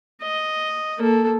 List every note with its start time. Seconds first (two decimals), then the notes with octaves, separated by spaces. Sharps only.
0.22 D#5
0.99 A#3 A4